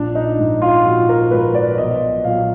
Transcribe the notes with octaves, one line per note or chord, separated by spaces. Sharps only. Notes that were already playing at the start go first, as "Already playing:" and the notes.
Already playing: A#1 D4
D#4
G#2 F3
F4
A#1 F#4
A#4
G#2 F3 B4
D5
B1 D#5
A#2 F#3 F5